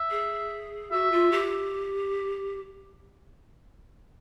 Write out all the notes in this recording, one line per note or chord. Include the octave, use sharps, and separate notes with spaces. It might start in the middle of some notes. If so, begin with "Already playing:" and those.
Already playing: E5
G#4
F#4 E5
F4
G4